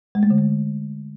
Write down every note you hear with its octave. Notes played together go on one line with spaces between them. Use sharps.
G#3
A3
D3
A3